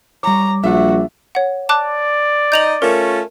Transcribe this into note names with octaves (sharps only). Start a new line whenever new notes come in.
G3 C#5 A#5 D6
A#1 F#2 D4 F#4 E5
C#5 F#5
D5 A5 D6 F#6
D#4 D#5 G6 F7 F#7
A3 C#4 F4 A#4